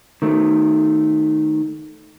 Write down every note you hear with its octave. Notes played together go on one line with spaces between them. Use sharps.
D#3 A3